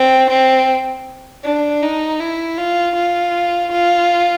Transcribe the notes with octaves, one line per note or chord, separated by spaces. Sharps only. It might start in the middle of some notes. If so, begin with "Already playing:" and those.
Already playing: C4
C4
D4
D#4
E4
F4
F4
F4